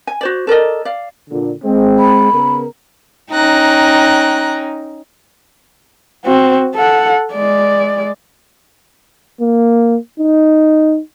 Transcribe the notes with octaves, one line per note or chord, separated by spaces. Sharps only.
G#5
F#4 C5 D5
A4 A#4 D5 D#5
D5 F5
A#2 D3
G#3 C4
B5
C#3 B3 A#4
C#4 D#4 G5 A#5 F#6
C4 F#4
A4 F#5
G#3 D5
A#3
D#4